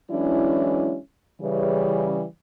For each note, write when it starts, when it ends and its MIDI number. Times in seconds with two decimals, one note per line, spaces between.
0.11 0.97 52
0.11 0.97 54
0.11 0.97 56
0.11 0.97 61
0.11 0.97 62
0.11 0.97 64
1.40 2.23 49
1.40 2.23 52
1.40 2.23 55